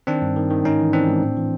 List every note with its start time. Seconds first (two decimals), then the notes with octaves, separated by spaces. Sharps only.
0.07 D#3 C4 D4
0.22 G2
0.36 D#3
0.50 D#3
0.64 G#2 C#4 D#4
0.80 E3
0.93 E3 C4 D4
1.08 G#2
1.22 A2
1.37 E3